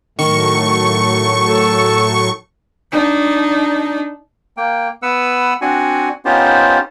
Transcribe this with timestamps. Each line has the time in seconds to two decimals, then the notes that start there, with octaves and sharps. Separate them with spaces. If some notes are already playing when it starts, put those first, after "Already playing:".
0.19 A2 D#3 F#3 A3 C#6
1.47 A4
2.92 D4 D#4
4.57 A#3 G5
5.02 B3 B4 F#5 E6
5.61 C4 D4 F#4 F#5 G#5
6.25 B3 C#4 D#4 F4 G4 C5